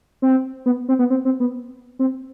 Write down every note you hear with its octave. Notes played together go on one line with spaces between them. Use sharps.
C4
B3
C4
B3
C4
C4
B3
C4